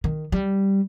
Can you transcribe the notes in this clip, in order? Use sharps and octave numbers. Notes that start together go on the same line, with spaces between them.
D#3
G3